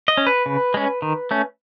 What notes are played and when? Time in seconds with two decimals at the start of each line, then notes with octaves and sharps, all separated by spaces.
0.08 D#5
0.17 C#4
0.27 B4
0.46 C#3
0.74 G#3 C#4
1.02 D#3
1.31 A3 C#4